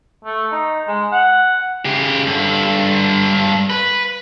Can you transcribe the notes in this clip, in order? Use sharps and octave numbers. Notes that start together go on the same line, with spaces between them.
A3
D#4
G#3
F#5
C#3 G4
G2 A4
B4